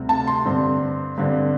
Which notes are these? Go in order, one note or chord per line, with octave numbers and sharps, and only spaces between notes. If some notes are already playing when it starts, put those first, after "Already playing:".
Already playing: D2 C3 G3 C4
A5
C6
G2 D3 C4
G2 D3 C4